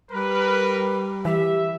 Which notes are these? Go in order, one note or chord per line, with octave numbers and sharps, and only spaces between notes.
G3 A#4 B4
E3 G4 E5